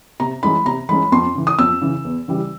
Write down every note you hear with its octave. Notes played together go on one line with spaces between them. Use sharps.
C3 A#5
E3 G#3 C#4 B5
C3 A#5
E3 G#3 C#4 B5
F2 C6
C#3 E3
D#6
F2 E6
C#3 E3
E2
C#3 E3 G3